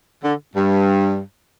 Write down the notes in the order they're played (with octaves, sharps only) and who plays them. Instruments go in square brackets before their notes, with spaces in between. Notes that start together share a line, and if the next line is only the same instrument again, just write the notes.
[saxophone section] D3
G2